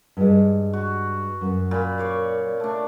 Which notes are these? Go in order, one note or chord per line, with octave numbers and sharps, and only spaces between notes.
G2 G#3
F#4
F#2
A#2 B5
C#5 D5 F5
A3 D4